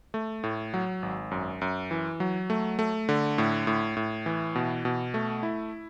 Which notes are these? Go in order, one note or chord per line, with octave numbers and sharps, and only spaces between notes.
A3
A2
F#3
G#1
F#2
F#2
E3
F#3
A3
A3
D3
A2
A2
A2
E3
B2
B2
A3
E4